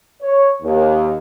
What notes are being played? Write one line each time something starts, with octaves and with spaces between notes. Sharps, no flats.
C#5
D#2